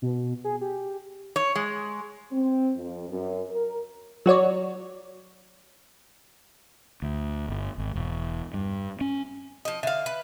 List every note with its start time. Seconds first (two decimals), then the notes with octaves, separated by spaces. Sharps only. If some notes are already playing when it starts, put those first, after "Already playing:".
0.02 B2
0.44 G#4
0.61 G4
1.36 C#5
1.56 G#3
2.32 C4
2.76 F2
3.08 F#2
3.50 A#4
4.26 F#3 F#4 C#5 D5
7.02 D2
7.48 G1
7.78 G#1
7.95 E1
8.54 G2
9.01 C#4
9.65 F3 D#5
9.83 D3 E5 F5
10.06 B4